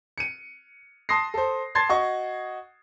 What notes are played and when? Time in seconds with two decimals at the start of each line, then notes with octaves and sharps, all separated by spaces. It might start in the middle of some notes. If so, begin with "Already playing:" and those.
0.18 C#7 D#7
1.09 A5 C6 D#6 A#6 C7
1.34 A4 C5
1.75 A5 C6 G#6 A6 C7
1.89 F#4 D#5 C#6